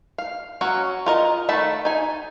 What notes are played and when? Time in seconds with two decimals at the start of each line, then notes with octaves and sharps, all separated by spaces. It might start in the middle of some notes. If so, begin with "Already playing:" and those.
0.18 F5
0.61 F#3 C#4 F#4
1.06 F4 A#4 D#5
1.49 D#3 A3 A5 B5
1.85 D#4 G#5